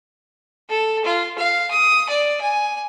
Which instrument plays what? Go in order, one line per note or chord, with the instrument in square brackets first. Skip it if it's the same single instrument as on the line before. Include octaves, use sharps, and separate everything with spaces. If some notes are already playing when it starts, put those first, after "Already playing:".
[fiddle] A4
F4
F5
D#6
D5
G#5